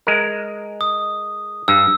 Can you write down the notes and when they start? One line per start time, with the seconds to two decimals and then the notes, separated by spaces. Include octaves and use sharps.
0.07 G#3 A#4
0.81 D#6
1.68 G2 E6